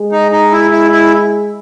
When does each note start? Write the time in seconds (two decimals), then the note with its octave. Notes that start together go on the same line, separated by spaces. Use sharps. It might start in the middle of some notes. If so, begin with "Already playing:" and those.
Already playing: G#3
0.12 D#4
0.32 D#4
0.52 E4
0.71 E4
0.92 E4